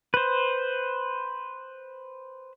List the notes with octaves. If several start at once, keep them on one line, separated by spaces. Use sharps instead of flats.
B4 C5